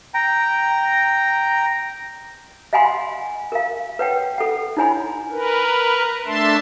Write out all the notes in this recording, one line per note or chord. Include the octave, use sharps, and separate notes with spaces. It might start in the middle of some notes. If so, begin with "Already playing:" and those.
G5 A#5
D#5 F5 F#5 G#5 B5 C6
A#4 F5
B4 C#5 F#5 G5
A4 F#5
D#4 E4 C#5 G#5 B5
A#4 B4
A3 D4 E5 A5 C6